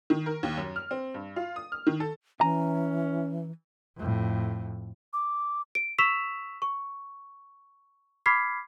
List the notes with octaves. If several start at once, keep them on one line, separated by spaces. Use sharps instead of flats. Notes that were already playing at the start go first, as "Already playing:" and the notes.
D#3
A#4
D#2
F#2
F6
C4
G2
F4
D#6
F6
D#3
A4
E3 C#4 G#5 A#5
F2 A2
D6
D7
C#6 E6 B6 E7 F7
C#6
B5 D6 F6 G#6 B6 C7